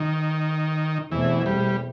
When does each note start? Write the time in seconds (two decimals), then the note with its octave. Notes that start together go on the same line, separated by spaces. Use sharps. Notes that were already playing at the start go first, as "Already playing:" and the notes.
Already playing: D#3
1.11 E2 B2 E3 A3 C4
1.46 G3